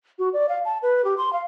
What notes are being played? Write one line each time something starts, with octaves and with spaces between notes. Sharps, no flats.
F#4
D5
F5
A5
B4
G4
C6
F5